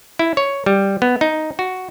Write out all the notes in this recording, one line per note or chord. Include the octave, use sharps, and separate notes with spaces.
E4
C#5
G3
B3
D#4
F#4